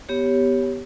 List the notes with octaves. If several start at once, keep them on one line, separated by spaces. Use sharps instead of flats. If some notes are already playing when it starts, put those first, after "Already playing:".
B3 G4 C#5